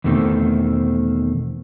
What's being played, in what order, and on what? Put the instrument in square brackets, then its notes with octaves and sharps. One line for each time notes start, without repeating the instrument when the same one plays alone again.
[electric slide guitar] E2 B2 D#3 A3 C4